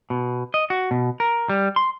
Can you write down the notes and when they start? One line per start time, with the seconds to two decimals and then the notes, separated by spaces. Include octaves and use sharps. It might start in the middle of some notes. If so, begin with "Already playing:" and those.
0.10 B2
0.54 D#5
0.70 F#4
0.91 B2
1.20 A#4
1.49 G3
1.76 C6